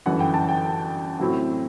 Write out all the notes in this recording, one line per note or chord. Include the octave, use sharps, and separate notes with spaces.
G1 F#2 E3 F#5
G5
A5
G5
A2 F#3 C4 E4